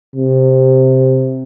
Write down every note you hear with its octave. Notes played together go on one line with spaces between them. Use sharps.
C3